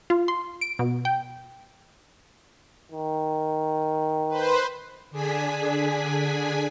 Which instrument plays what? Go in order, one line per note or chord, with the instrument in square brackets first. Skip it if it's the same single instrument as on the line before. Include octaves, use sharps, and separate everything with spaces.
[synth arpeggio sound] F4
C6
D7
B2
G5
[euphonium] D#3
[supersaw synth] B4 C5
[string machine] D3 D4 G#4 G#5 B6